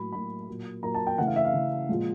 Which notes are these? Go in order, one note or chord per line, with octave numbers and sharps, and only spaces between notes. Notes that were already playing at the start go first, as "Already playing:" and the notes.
Already playing: A2 F#3 A#3 B5
A2 F#3 A#3 B5
A#2 F#3 A#3
A#2 F#3 A#3 A#5
A5
G5
C#3 E3 A3 F#5
F5
E5
F5
C#3 E3 A3
A#2 F3 G#3